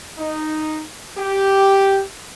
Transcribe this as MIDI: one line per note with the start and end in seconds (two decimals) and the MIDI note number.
0.19 0.83 63
1.19 2.02 67